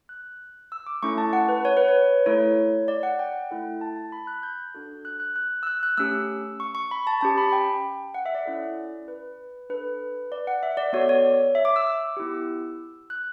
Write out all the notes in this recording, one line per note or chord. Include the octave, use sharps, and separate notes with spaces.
F#6
E6
D6
A3 C#4 E4 A4 C#6
A5
F#5
B4
C#5
B4
C#5
A3 E4 A4 C#5
D5
F#5
G5
A3 E4 A4
A5
A5
B5
F#6
G6
D4 F#4 A4
F#6
F#6
F#6
E6
F#6
F#6
A3 C#4 G4 E6
C#6
C#6
B5
A5
C#4 G4 A5
B5
G5
F#5
E5
D5
C#4 E4 A4
B4
D4 A4 B4
D5
F#5
E5
D5
B3 F#4 A4 C#5
D5
C#5
E5
D6
E6
E6
B3 E4 G4
F#6